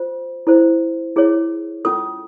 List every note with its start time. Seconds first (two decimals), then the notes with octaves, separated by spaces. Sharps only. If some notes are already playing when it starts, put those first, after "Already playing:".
Already playing: F4 C5
0.47 E4 A4 C5
1.16 E4 G#4 C#5
1.85 C#4 F4 A4 D#6